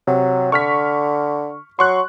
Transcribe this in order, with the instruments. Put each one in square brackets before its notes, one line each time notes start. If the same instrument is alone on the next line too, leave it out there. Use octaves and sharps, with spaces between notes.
[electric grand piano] C3 [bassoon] F#3
[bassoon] D3 [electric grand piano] C#6 F6 B6
[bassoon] F#3 [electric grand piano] C6 C#6 F#6